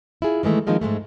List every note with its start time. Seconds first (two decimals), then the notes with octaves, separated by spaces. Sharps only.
0.22 E4 F4 G#4
0.43 D#3 E3 G#3 A3
0.67 D#3 F3 G#3 A#3 C4 D#4
0.81 G#2 E3 G#3 A3